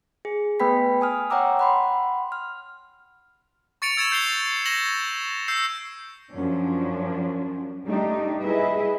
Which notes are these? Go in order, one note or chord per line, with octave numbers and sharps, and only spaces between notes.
G#4
A3 B3 B4 G5 B5 B6
G#5 D#6 F6
C#5 F#5 G5 A#5 D6 E6
F#5 B5 C6
F6
C#6 A6 C#7 D7 F7
E6 G#6 A6 C#7 D7 E7
G6 C7 F7 G7
C#6 G#6 A#6 E7 F#7 G7
E6 G6 C7
F#2 F3 C#4 D4
G3 A3 D4 D#4 G4
G3 E4 G#4 B4 D#5 E5